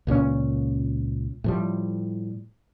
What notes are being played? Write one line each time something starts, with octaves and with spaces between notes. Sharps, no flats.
C#2 A#2 F3 C#4
A2 F3 G3